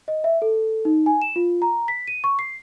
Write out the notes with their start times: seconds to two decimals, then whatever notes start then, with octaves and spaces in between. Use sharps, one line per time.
0.08 D#5
0.24 E5
0.42 A4
0.85 D#4
1.06 G#5
1.22 E7
1.36 F4
1.62 A#5
1.88 B6
2.07 D#7
2.24 C#6
2.39 C7